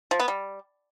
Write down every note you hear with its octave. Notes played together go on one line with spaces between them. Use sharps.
F3
B3
G3